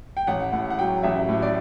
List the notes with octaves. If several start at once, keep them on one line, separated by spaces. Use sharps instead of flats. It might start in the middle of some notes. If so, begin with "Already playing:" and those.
G5
A1 F#5
A2 F#5
F#5
F#3 G5
A1 E5
A2
D5